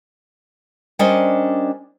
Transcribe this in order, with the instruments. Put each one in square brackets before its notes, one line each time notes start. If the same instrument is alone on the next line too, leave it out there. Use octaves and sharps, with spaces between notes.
[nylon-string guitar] G3 C#4 D4 A#4 C5 D#5